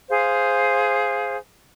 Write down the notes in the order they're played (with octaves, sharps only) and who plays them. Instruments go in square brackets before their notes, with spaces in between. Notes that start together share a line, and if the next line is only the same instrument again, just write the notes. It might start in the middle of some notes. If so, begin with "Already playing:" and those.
[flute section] G#4 C5 F5